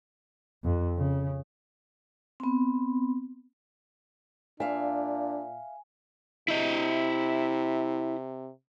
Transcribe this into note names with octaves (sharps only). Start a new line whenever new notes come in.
F2
C#3
B3 C4
A#2 D4 E5 F5 G#5
C3 E4 D#5